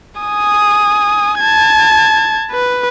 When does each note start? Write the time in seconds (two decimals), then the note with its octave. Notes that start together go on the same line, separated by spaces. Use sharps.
0.21 G#5 D#6
1.40 A5 G#6
2.51 B4